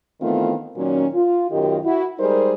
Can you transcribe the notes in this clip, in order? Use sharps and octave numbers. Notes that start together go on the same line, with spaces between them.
D#3 E3 A3 B3 C4 F4
A#2 D#3 F#3 C#4
F4
F#2 B2 D#3 F4 G4 D#5
E4 F#4
G3 G#3 D#4 G#4 A#4 C5